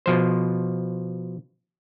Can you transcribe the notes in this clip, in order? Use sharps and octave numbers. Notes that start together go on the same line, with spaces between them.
B2 F3 C5